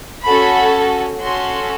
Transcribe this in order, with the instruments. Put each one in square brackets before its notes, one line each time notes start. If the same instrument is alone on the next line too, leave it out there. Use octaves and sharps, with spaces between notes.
[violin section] C#4 F#4 A4 B5
C#4 F#4 A4 C6